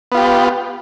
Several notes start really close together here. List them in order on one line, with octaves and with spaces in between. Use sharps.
B3 F4 G4